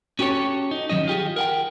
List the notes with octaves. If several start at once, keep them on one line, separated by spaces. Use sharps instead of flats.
C#4 F#4 G4 A4 C#5
D#4
D#3 F#3 C#4 D#5
F4 G4 G#4
A#4 F#5 G5